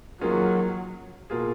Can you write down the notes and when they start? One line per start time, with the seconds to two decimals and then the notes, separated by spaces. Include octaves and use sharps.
0.21 D#3 F#3 A#3 C#4 F4 G#4
1.30 B2 A#3 F4 G#4